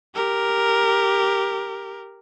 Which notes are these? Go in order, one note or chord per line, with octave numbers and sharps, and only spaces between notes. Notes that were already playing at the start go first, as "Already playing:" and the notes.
G4 A#4